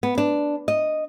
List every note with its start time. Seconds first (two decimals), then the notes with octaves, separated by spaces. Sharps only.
0.03 B3
0.18 D4
0.68 D#5